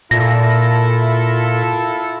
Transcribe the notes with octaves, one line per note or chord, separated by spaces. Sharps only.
A#2 E4 F4 A4 A#6